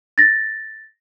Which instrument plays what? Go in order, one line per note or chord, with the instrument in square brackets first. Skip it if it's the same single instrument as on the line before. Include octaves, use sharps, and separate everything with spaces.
[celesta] A6 A#6